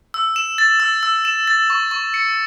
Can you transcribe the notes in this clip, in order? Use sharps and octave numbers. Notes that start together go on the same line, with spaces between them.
E6
E7
A6
E6
E6
E7
A6
C#6
C#6
C#7